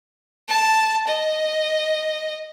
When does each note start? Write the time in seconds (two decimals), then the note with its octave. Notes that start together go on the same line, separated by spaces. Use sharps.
0.48 A5
1.07 D#5